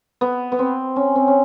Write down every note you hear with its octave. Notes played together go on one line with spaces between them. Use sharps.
B3
B3
C4
C#4
C4
C#4